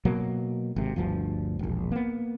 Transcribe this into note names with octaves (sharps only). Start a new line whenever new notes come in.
B2 F#3 A#3
G#1 C3
G1 D2 G2 F3
E1 A#1
A#3 B3